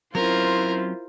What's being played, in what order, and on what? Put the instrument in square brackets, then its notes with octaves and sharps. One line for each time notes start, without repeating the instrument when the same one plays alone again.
[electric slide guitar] F#3 C4 C#4 [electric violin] E4 C5 [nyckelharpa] F4 [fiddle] A#4